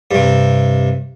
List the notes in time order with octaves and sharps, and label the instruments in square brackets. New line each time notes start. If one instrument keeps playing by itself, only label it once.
[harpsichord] G2 C3